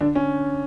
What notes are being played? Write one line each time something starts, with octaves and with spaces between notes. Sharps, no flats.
D3 D4
C#4